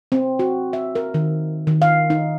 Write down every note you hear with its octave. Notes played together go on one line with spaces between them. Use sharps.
C4
F#4
E5
A#4
D#3
D#3
F5
D#4